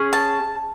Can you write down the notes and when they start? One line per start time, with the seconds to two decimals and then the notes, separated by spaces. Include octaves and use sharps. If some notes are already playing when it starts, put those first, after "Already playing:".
Already playing: C#4 G#4
0.13 A5